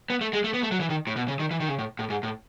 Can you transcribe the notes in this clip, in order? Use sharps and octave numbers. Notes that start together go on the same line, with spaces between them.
B3
A3
G#3
A3
B3
A3
F#3
E3
D#3
A2
B2
C#3
D#3
E3
D#3
C#3
A2
A2
G#2
A2